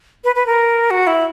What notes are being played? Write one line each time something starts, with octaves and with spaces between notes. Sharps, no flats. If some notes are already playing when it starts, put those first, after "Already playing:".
B4
B4
A#4
F#4
E4